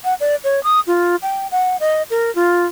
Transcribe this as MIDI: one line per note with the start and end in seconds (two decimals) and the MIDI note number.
0.04 0.14 78
0.20 0.36 74
0.44 0.63 73
0.63 0.80 87
0.87 1.16 65
1.22 1.47 79
1.51 1.77 78
1.80 2.03 75
2.10 2.33 70
2.35 2.67 65